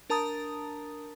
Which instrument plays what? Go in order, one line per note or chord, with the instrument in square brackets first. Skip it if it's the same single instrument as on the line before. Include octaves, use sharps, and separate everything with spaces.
[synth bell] D4 A#4 A5 A#5 D#6 A6